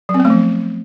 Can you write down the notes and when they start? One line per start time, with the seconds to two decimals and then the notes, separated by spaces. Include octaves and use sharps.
0.09 F#3
0.14 C4
0.20 B3
0.25 A3
0.30 F3